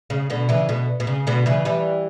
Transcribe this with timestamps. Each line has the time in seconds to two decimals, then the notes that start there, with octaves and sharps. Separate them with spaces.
0.10 C#3
0.30 B2 D3
0.49 C#3 E3
0.69 B2 D3
1.00 B2
1.07 C#3
1.27 B2 D3
1.46 C#3 E3
1.65 E3 G3